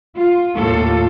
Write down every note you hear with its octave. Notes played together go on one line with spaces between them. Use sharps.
F4
D#2 A2 A#3 F4 A4